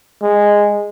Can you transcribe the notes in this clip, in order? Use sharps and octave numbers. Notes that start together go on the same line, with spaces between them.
G#3